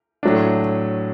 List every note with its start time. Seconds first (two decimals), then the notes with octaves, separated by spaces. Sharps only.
0.23 A2 F#3 A3 D4